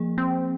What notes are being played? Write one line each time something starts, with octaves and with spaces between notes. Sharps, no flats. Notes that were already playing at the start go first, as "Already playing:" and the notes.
Already playing: F3 A#3 G#4
C4